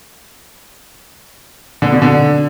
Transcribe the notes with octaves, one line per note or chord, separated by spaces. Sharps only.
D3
B2
D3